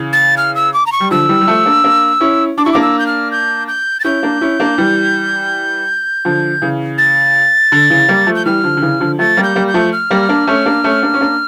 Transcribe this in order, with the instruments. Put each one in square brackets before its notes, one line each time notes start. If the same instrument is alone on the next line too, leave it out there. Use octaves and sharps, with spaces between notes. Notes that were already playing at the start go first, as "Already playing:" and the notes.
Already playing: [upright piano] C#3 E3
[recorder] A6
F6
E6
D6
A#5
C#6
[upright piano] G3
[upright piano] D3 F3 [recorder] E6
[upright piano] E3 G3
G3
F3 A3
A#3 D4
A#3 D4
C#4 E4
[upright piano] D4 [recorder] D6
[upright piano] E4 [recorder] C#6
[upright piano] A#3 D4 [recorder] D6
[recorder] E6
G6
F6
G6
G6
A6
[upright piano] C#4 E4 [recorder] G6
[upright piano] A#3 D4
C#4 E4
A#3 D4
E3 G3
D3 F3
C#3 E3
[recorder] A6
[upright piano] D3
C#3 E3
G3 A#3
F3 A3
[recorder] G6
[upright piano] E3 G3 [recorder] F6
[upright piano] D3 F3
D3
C#3 E3
D3 F3
[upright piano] F3 A3 [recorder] A6
[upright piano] G3 A#3
[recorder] G6
[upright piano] G3 A#3
[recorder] G6
[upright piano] F3 A3
[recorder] F6
[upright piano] G3 A#3
A#3 D4
A3 C#4
A#3 D4
A3 C#4
A#3 D4
C#4
A#3 D4